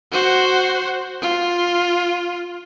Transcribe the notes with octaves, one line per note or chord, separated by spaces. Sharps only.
F#4 C5
F4